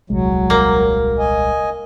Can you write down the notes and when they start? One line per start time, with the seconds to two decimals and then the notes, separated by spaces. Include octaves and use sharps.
0.10 D#1 C2 F#3 G#3
0.50 A#3
1.19 D#5 G#5